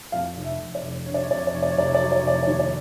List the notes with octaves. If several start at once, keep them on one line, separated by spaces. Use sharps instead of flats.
F2 F5
F1
E5
F1
D5
F1
D3 C#5
D5
C#5
F2 D5
C#5
D5
F1 C#5
D5
C#5
F1 D5
C#5
D5
F#3 C#5
D5
C#5
F1 D5
C#5
D5
D#2 C#5
D5